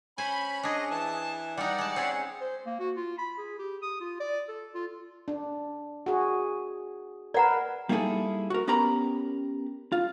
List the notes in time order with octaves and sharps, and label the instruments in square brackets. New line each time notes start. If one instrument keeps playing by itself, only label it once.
[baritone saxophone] C#4 [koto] C5 G#5 [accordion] B5
[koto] D4 G#4 [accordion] D#5
[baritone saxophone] E3 [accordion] A5
[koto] G3 D#4 [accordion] D5 F#5
[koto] G#3 A5
[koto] C4 G#4 [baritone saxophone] C#4
[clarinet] C5
A#3
F#4
F4
B5
G#4
G4
D#6
F4
D5
A4
F4
[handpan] D4
F#4 G#4
[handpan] A#4 B4 [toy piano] D5 F#5 A#5
[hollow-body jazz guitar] G3 A#3 D#4 E4 G#4 A4
F#4 A#4
B3 C#4 G4 A#4 A#5 B5
F4